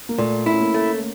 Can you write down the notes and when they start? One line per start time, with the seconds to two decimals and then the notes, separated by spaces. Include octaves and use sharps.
0.09 A#3
0.18 A#2 A3
0.46 E4
0.53 C#4
0.61 A#3
0.74 A3